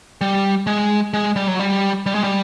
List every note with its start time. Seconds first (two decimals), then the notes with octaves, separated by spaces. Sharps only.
0.21 G3
0.67 G#3
1.14 G#3
1.36 G3
1.48 F#3
1.59 G3
2.06 G3
2.15 G#3
2.24 G3